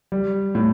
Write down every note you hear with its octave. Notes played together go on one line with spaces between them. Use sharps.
G3
A2